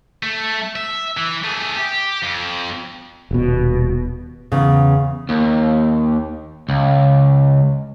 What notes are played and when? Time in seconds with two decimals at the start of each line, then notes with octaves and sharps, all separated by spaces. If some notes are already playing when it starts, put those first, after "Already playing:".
0.23 A3
0.76 E5
1.17 E3
1.44 A3 G#4
1.77 G4
2.22 F2
3.31 D#1 B2
4.52 E2 C#3
5.29 D#2
6.69 C#2